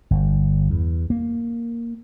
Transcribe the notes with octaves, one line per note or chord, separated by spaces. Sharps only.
G1
E2
A#3